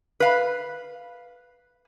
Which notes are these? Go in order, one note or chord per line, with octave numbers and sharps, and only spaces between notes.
B4 F5